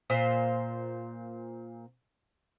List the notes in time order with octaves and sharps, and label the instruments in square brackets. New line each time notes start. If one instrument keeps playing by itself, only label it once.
[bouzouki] A#2 C5 F5